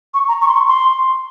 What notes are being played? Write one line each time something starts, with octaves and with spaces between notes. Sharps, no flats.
C#6
A#5
C#6
C6
C#6
C6